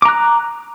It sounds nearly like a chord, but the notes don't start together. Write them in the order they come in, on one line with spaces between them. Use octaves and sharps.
D6 A#5 F#6